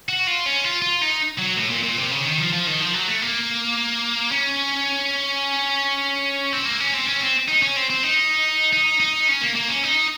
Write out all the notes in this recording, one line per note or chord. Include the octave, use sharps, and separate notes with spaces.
F#4
F4
C#4
F4
F4
D#4
F#3
A2
A#2
A#2
C3
C#3
D#3
F3
F3
D#3
F3
F#3
A3
A#3
C#4
C4
A#3
C#4
C4
C#4
C4
D#4
C#4
C4
C4
D#4
D#4
D#4
C#4
A#3
A#3
C#4
D#4